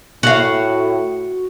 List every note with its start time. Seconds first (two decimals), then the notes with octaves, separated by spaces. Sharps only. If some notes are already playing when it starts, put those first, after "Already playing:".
0.23 A2 F#4 F5